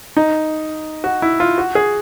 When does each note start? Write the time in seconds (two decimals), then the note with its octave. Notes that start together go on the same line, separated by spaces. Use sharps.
0.17 D#4
1.04 F#4
1.22 E4
1.40 F4
1.58 F#4
1.75 G#4